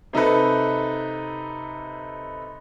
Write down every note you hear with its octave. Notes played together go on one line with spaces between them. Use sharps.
C3 D#4 A4 B4